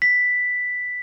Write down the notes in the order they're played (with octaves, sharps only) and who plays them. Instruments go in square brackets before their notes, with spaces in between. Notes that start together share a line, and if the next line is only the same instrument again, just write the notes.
[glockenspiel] B6